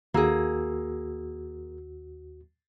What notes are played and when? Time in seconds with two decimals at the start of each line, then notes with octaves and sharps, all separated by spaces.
0.14 D#2 A#3 F#4 G#4 E6